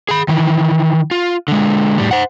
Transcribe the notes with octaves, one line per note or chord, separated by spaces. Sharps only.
G#4 B5
D#3 E3
F4
D3 G#3
A2 G3
C5 F#5